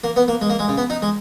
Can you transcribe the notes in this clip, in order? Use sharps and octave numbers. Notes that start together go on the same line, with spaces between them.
A#3
B3
A#3
G#3
A#3
G#3
C#3
B3
D#4
G#3